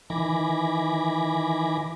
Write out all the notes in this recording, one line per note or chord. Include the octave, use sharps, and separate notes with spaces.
D#3 E3 G#5 B5 D6 A#6